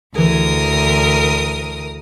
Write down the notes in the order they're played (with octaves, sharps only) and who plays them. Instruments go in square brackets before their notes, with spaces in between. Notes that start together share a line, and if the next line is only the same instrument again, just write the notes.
[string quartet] D2 A#4 D#6 [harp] E3 G#4